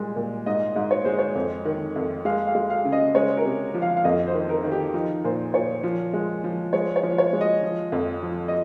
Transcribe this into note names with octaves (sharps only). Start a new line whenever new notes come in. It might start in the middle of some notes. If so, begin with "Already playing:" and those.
Already playing: A#2 G3 G#3
A#2
G#2 D#5
G#2
C#5
G#3 C5
C#5
F2
D#3
F2
G#3 F5
F5
G#3
F5
C#3
D#5
G#3 C#5
A#4
C3
F3
F5
F5
F2 D#5
C5
D#3
A#4
D#3
G4
F3 D#4
A#2 C5
A#2 C#5
F3
G#3
F3
G#3 C#5
C#5
F3
C#5
G#3
D#5
F3
F2
F3
D#5